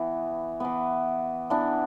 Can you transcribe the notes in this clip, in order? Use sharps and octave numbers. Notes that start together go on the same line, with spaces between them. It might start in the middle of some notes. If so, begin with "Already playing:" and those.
Already playing: E3 B3
E3 B3
E3 B3 D4